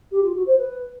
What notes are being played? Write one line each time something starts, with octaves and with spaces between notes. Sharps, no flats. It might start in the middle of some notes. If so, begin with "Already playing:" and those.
G4
F4
F#4
C5
B4